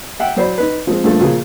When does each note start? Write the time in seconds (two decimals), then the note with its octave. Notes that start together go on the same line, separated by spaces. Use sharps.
0.20 E5 F#5 G5
0.37 F#3 C5 D5 B5
0.58 D#4 B4
0.87 F3 G#3 C4
1.04 G2 F3 A3 A#3
1.20 A#2 C#3 F3 A#3 G#4